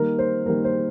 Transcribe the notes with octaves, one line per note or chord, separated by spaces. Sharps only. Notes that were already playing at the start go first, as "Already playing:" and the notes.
Already playing: D#3 G3 A#3 A#4
C5
D#3 G3 A#3 A#4
C5